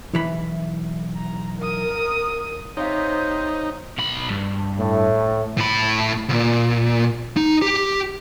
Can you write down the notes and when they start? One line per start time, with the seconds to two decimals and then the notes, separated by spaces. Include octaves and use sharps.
0.14 B1 E3 E4 B5
1.17 A#5
1.59 A#4 D#6
2.77 C3 D#4 C5 C#5 F5
3.98 B1 B5
4.30 G2
4.79 A2
5.58 A2 B5
6.29 C#2 A#2
7.37 D#4
7.62 G4